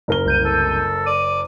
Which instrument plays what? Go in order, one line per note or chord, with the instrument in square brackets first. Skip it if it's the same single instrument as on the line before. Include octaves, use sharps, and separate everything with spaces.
[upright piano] F#1 A#4 G7
[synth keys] C2 G6 D#7
[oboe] A4
[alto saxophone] D5 [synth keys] D#7